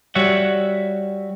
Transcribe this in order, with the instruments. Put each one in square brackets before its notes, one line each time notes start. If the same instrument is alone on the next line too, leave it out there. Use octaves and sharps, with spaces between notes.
[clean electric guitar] G3 F#4 C#5 E5 F#5